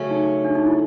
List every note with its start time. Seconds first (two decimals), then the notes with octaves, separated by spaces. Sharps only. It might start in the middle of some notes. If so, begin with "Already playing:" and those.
Already playing: C#3 F#3 A3 C#4
0.11 D#4
0.45 D4
0.55 D#4
0.67 E4